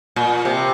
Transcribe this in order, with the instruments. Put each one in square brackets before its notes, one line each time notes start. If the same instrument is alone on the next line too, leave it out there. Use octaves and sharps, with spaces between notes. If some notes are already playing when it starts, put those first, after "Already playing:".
[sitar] A#2
C3